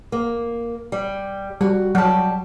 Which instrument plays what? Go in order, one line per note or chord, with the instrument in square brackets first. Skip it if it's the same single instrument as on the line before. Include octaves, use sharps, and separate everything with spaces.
[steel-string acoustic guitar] A#3
G3
[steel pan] G3 [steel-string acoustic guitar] F#4
[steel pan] F#3 [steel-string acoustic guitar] G3 A5